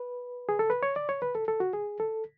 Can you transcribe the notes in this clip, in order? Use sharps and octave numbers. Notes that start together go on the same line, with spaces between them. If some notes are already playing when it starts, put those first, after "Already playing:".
Already playing: B4
G#4
A4
B4
C#5
D5
C#5
B4
A4
A4
F#4
G#4
A4